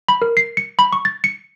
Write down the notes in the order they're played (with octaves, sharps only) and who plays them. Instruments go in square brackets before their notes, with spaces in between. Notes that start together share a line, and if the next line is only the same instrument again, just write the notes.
[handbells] B5
A#4
C7
C#7
B5
C#6
A6
C#7